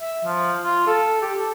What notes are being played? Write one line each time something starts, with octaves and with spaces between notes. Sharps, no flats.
E5
F3
F4
A4
G4
A4